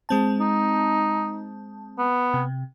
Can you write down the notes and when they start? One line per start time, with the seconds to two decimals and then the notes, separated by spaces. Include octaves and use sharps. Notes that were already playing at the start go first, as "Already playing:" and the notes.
0.09 G#3 C4 A5
0.40 D#4
1.98 B3
2.34 C3